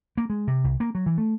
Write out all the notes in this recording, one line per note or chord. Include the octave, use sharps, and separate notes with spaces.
A#3
G#3
C3
C2
A#3
F#3
E3
A3